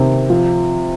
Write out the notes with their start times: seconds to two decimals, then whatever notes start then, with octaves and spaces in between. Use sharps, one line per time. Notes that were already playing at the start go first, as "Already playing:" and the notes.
Already playing: C3 D#3
0.30 F3